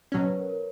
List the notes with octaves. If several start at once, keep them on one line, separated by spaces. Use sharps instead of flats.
B2 F#3 C#4 C#5
B4
A#4
A#4